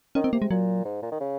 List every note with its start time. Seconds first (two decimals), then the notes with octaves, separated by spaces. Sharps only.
0.15 D#3 C#4
0.24 C4
0.33 C3 A#3
0.42 G#3
0.51 A#2 F#3
0.85 G#2
1.02 A#2
1.11 D#3
1.20 C#3